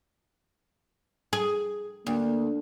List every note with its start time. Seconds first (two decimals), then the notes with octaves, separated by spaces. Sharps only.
1.33 G#4
2.07 D2 A#3